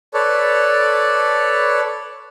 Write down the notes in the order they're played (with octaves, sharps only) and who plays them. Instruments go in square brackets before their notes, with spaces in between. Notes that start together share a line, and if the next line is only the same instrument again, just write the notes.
[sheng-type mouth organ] A4 B4 C#5 D5